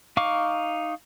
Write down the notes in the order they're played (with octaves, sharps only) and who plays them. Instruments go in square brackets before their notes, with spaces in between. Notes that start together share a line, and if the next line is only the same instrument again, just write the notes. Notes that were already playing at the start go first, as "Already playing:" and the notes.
[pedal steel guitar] D#4 F5 C#6 D6